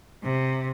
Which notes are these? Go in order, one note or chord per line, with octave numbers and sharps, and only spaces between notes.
C3